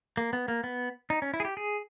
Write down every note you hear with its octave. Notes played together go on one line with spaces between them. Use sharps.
A#3
B3
A#3
B3
D#4
C#4
E4
G#4
G4
G#4